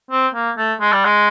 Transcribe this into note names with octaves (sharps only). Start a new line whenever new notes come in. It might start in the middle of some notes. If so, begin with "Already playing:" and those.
C4
A#3
A3
G#3
G3
G#3